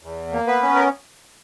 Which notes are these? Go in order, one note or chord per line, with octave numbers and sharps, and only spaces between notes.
E2
A#3
B3 B4
C#4
A#4